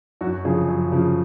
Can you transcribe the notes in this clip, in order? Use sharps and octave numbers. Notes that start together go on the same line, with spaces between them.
F#2 F#4
C#3 F3 G#4
F#2
C#3 F3